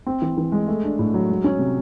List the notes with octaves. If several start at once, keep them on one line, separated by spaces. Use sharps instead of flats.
C4
E3
E3
G#3
A3
D4
A2
F#3
G#3
C#4
C3